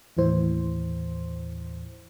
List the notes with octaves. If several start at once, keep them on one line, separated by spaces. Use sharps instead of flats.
D#2 A2 E3 C5